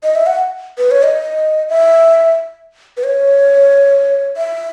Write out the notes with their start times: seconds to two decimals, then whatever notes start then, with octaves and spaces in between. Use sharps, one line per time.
0.03 D#5
0.15 E5
0.26 F#5
0.78 B4
0.91 C#5
1.03 D#5
1.69 E5
2.97 B4
3.04 C#5
4.37 E5